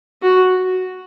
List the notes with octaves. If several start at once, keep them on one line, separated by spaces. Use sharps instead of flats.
F#4